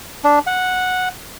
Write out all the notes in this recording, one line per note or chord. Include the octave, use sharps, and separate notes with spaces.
D4
F#5